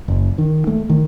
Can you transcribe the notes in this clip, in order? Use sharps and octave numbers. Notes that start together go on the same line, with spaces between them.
F#1
D#3
A3
D#3